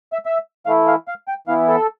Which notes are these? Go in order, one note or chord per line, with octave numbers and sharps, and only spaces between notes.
E5
E5
E3 A3 E4 F5
F5
F5
G5
E3 B3 E4 F5
A4